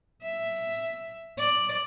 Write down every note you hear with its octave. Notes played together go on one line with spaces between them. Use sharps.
E5
D5